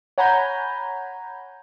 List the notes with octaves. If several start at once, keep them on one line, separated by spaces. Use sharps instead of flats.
C#5 F#5 G#5 A#5 B5 G6